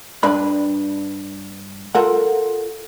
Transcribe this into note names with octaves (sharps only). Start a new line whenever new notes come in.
G2 D4 B4 D5 B5
F4 A4 A#4 F#5